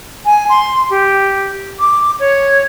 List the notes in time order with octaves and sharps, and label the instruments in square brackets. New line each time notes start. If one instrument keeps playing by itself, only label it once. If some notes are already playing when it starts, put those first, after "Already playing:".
[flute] G#5
C6
G4
D6
C#5